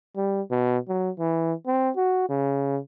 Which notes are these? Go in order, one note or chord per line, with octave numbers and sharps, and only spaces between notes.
G3
B2
F#3
E3
C4
F#4
C#3